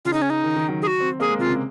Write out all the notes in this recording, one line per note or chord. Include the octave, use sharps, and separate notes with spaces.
C#3 F4
D#4
C#4
D#4
D#3
D#3
F#3
G#4
F#4
C4
A#3 G#4
G#3
C3 F4
C#3